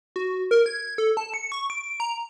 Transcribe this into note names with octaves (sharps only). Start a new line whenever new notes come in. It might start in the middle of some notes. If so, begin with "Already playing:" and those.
F#4
A#4
G#6
A4
A5
C#7
C#6
D7
A#5